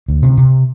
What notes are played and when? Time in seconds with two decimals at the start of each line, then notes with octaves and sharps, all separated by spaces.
0.08 D2
0.23 C3
0.37 C3